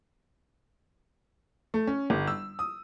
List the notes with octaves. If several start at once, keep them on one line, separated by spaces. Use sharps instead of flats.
A3
C#4
G1
E6
D#6